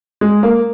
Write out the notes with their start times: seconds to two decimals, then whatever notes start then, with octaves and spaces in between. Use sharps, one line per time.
0.21 G#3
0.43 A#3